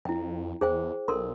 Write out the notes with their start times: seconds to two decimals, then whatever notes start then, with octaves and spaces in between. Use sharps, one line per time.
0.05 F2 E4 G5
0.61 E2 G#4 C5 G5
1.08 B1 A4 A#4 C6